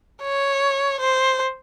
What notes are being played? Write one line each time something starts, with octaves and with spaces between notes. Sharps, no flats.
C#5
C5